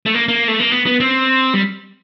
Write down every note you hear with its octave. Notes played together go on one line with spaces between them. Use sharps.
A3
A#3
A#3
A3
A#3
B3
B3
C4
G3